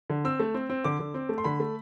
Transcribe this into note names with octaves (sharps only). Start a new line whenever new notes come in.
D3
C4 E6
A3
C4
C4
D3 D6
D3
C4
A3
C6
D3 B5
A3